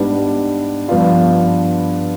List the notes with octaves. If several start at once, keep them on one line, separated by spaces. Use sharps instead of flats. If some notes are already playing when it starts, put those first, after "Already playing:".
Already playing: G#2 G3 B3 D4
G2 F3 B3 D4 F4